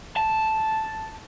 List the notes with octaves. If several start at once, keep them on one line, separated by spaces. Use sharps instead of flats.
A5